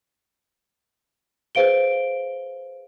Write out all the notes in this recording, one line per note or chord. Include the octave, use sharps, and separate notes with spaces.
G#4 B4 C5 F5 D7 G7